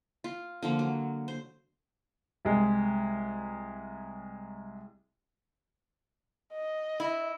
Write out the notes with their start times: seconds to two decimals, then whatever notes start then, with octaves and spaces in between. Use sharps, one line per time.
0.24 F4
0.62 D3 F3 A#3
0.79 F#3
1.28 C5
2.45 C2 G#3
6.53 D#5
7.00 E4